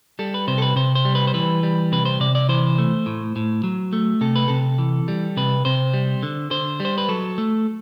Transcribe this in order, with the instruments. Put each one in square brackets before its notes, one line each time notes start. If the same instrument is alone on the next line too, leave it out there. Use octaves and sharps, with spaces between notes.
[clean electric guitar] G3 A4
B4
C3 C5
A4
B4
C3 C5
C5
G3
B4
C5
E3 B4
G3
C3 B4
C5
C3 D5
D5
E3 C5
A3
A2
A2
F#3
A3
C3 A4
B4
C3 A4
E3
G3
C3 B4
C3 C5
G3
D3
D3 C5
G3
C5
B4
F#3 A4
A3